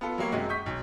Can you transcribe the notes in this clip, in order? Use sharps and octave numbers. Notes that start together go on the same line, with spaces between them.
B3 F4 A4
F#3 G3 A#3 C#5
F#2 C3 G#3 F#4
C#6 D#6 G6 B6
B1